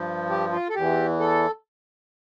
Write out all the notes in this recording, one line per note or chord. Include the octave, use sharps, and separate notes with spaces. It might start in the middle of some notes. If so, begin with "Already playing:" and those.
Already playing: G2 F3
G4
F4
A4
E2 E3 G4
A4